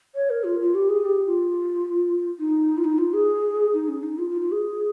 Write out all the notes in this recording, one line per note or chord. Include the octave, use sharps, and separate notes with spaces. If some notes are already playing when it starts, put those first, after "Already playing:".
C#5
A#4
F4
F4
G4
G#4
G4
F4
D#4
F4
D#4
F4
G#4
D#4
C#4
D#4
F4
F4
F4
G#4